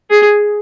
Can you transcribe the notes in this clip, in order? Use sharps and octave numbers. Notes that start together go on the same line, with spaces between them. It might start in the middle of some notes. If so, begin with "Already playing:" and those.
G#4